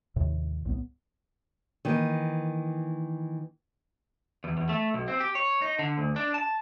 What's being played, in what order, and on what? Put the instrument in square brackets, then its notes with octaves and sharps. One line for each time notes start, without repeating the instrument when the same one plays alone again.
[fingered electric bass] D#2 A2 C3 D#3
C2 A2 B3
[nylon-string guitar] D#3 E3 A#3
[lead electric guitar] E2
E2
A3
B1
C4
G4
C#5
D#4
D3
D2
D4
A5